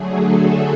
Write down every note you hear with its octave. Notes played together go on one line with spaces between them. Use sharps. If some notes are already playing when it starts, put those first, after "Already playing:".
Already playing: D3 F#3 A3 G#4
A4